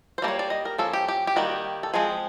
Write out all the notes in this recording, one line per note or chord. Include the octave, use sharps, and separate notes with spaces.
C5
G3 A#3 D4
C#5
D5
D#5
A#4
F3 A#3 C#4 A4
G4
G4
G4
D#3 G3 A#3 F#4
A4
F3 G#3 C4 G#4